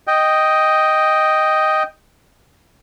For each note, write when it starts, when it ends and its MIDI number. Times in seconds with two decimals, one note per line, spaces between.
0.07 1.83 75
0.07 1.83 79